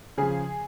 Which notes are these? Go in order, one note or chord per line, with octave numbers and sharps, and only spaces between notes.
C#3 F3 G#4